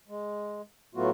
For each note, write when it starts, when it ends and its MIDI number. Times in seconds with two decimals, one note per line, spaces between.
0.08 0.62 56
0.95 1.10 45
0.95 1.10 54
0.95 1.10 57
0.95 1.10 59
0.95 1.10 65
0.95 1.10 66